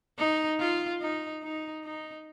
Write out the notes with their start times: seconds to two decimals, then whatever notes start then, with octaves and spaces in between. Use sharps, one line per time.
0.18 D#4
0.60 F4
1.01 D#4
1.43 D#4
1.84 D#4